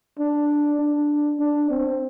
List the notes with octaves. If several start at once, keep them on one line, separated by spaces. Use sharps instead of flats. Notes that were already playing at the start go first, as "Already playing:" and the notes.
D4
D4
D4
C4